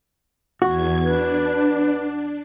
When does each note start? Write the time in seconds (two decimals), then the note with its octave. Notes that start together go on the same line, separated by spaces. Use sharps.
0.62 E2 F#4 G#6
1.05 D4 B4